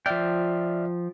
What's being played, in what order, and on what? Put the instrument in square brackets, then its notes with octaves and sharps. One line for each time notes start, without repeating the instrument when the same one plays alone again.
[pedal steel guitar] F3 G5 [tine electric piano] D5 E5 F6